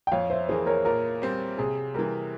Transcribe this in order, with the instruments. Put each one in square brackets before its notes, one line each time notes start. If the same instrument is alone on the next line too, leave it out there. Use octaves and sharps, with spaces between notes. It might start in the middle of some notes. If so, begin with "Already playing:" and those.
[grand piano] G5
[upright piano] F2 [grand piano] C#5 F5
[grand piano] C5 E5
[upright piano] E3 A#3 [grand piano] G#4 C5
[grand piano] A#4 C#5
[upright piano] A#2 [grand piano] A#4
[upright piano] G3 C4
[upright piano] C3 [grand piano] G#4
[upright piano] E3 G3 [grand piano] A#4